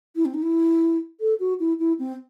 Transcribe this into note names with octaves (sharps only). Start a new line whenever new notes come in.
E4
C4
D#4
E4
A4
F#4
E4
E4
C4